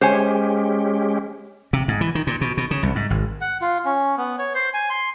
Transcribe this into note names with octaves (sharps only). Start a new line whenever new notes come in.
G#3 C#4 G4 C5 C#5 G#5
C3
G#2
E3
D#3
A#2
B2
B2
C#3
C2
G#2
G#1
F#5
F4
C#4
B3
C#5
C5
G#5
C6